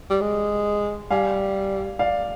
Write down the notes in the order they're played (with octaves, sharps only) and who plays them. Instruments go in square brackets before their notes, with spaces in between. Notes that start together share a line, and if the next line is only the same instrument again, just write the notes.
[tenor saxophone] G3
G#3
[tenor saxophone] G3 [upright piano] F5 G#5
[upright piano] D5 F5